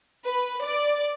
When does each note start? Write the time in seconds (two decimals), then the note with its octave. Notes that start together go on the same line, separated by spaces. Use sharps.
0.24 B4
0.61 D5